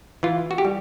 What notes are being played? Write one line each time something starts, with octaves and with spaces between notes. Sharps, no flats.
E3 F4
F#4
G4
G3